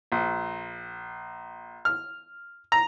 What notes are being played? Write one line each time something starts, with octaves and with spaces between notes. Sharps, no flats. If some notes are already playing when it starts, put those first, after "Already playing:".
A#1
F6
A#5